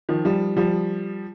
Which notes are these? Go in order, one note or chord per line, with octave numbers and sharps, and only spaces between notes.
D#3 F3
F3 G3
F3 G3